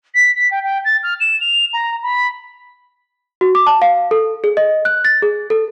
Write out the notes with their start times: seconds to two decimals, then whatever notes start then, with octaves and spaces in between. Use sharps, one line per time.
0.14 B6
0.34 B6
0.51 G5
0.64 G5
0.84 A6
1.03 F6
1.20 E7
1.40 F7
1.73 A#5
2.02 B5
3.41 F#4
3.55 D6
3.67 A5
3.82 F5
4.11 A4
4.44 G#4
4.57 D#5
4.85 F#6
5.05 A6
5.22 G#4
5.50 A4